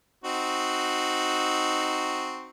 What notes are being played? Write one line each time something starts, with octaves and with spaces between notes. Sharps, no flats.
C4 D#4 F#4